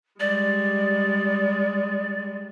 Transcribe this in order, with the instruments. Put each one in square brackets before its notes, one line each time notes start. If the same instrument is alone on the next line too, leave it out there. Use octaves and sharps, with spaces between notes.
[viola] G3 G#3 [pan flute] D5